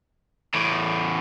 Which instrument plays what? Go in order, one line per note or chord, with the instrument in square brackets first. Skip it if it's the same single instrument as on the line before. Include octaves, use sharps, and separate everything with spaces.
[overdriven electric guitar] E2 A2